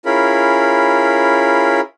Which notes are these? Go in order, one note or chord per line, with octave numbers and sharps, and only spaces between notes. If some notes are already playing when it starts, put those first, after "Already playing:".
C#4 E4 F4 G#4 A#4 B5